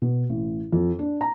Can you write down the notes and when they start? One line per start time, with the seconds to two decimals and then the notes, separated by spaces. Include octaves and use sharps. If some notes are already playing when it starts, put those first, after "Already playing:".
0.02 B2
0.29 A1
0.72 F2
0.99 D4
1.21 A#5